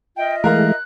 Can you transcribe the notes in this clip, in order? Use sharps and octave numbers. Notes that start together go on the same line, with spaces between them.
F4 D#5 E5 G5
E3 G#3 A3 A#4 F5 A#5 F#6